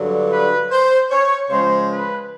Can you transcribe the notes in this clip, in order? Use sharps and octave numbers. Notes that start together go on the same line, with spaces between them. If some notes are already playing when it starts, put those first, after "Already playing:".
Already playing: G2 D3 F#3
B4
C5
C#5
C#3 F3 G#3 C5
B4